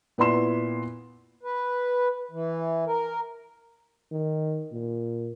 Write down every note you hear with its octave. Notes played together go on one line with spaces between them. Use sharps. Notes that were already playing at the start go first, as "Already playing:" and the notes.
A#2 B3 E4 D5 C6 E7
B4
E3
A#4
D#3
A#2